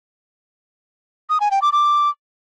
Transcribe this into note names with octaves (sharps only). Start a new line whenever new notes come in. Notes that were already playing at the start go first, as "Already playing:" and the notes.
D#6
G#5
G5
D6
D6